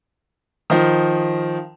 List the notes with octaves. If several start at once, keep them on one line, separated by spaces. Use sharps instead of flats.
D#3 F3